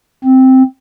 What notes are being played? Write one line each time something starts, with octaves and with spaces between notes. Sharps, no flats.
C4